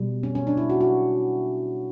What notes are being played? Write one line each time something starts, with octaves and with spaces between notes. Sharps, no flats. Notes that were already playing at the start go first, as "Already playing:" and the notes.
Already playing: B2 G3
C#4
C#4
D4
E4
F#4
F#4